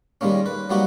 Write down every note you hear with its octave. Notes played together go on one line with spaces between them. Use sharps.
D#3 G3 G#3 A#3 C#4
B4
F#3 G3 A#3 B3 D#4 F#4